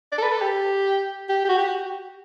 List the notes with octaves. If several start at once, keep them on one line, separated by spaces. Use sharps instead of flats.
D5
A4
B4
A4
G4
G4
G4
F#4
G4
F#4